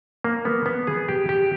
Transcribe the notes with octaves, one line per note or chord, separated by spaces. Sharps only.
A#3
B3
B3
G#4
G4
G4